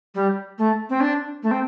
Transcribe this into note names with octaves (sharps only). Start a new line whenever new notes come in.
G3
A3
C4
D4
A3
C4